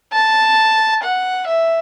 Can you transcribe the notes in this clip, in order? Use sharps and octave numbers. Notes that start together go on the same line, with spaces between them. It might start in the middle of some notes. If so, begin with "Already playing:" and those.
A5
F#5
E5